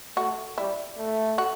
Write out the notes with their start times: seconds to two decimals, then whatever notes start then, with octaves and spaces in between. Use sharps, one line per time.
0.17 A3 F#4
0.57 G3 E4
0.98 A3
1.38 F#4